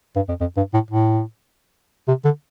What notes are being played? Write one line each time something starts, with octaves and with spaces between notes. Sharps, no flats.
G2
F2
F2
G2
A2
A2
C3
D3